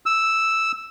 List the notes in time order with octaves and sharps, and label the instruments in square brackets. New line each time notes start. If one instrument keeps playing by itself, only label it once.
[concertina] E6